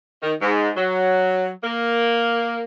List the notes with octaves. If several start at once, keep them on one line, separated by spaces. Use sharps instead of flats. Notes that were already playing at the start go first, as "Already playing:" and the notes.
D#3
G#2
F#3
A#3